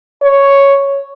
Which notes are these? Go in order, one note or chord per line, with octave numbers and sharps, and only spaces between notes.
C#5